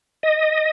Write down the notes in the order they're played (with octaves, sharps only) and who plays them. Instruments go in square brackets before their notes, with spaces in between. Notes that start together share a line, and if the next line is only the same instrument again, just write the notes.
[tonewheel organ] D#5